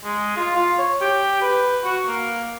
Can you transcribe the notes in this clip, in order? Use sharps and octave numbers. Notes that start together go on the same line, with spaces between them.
G#3
F4
F4
C#5
G4
B4
F#4
A#3